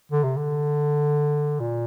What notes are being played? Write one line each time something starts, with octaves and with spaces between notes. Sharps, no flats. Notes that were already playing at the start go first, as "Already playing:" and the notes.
D3
C3
D3
A#2